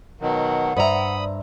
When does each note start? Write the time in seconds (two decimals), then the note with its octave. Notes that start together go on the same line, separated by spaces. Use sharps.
0.21 B2 D#3 F#3 F#5
0.77 G2 C5 D5 E5 A#5 B5 D#6